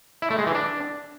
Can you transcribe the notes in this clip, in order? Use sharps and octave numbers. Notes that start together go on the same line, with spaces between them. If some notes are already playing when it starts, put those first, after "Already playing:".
E4
A3
G#3
E3
D4